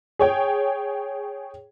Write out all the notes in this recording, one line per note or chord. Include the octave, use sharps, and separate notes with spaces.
G#4 C#5 G5